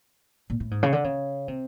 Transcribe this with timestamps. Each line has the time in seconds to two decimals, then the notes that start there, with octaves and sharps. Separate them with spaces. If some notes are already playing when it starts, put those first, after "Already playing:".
0.50 A#2
0.60 A2
0.71 G#2
0.83 C#3
0.92 D3
1.04 C#3
1.48 C3